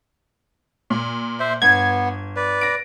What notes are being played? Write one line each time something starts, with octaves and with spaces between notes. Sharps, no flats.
A#2
C5 E5
G1 B3 G#6
B4 D5
A#6 D7